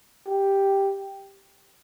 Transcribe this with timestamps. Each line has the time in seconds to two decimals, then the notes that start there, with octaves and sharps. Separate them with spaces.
0.27 G4